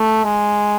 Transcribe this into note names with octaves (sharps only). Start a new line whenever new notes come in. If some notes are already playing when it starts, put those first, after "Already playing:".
Already playing: A3
G#3